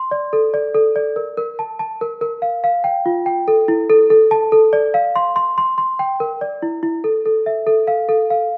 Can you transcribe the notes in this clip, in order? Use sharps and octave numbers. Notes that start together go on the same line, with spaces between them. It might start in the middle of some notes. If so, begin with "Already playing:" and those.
Already playing: C6
D5
A4
D5
A4
D5
A#4
A#4
A5
A5
A#4
A#4
F5
F5
G5
F4
G5
A4
E4
A4
A4
A5
A4
D5
F5
C6
C6
C6
C6
G5
A#4
D5
E4
E4
A4
A4
E5
A4
F5
A4
F5